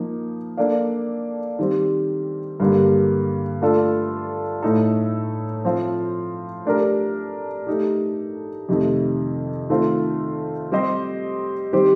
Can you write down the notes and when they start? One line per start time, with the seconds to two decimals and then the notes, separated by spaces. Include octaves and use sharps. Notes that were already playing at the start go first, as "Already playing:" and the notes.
Already playing: F3 A#3 D#4
0.57 A#3 D4 A4 D5 F5
1.59 D#3 G3 C4
2.60 G2 D3 G3 A#3
3.62 A3 D4 F4 A4
4.63 A2 A3 D#4 A4
5.64 F3 C4 F4 C5
6.66 A3 D4 G4 A#4
7.67 A3 D#4 G4
8.69 F2 C3 D#3 A3
9.70 D#3 A3 C4 F4
10.71 G3 C4 G4 C5 D#5
11.73 D#3 G3 C4 G4 C5